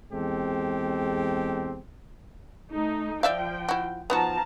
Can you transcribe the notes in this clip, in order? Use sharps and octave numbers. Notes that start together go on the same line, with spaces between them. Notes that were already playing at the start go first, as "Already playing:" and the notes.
E2 G#3 C4 G4 A4
A3 D#4
F3 D5 E5 F5 G5
E4 F#4
F3 B3 D#4 F#4 A5 A#5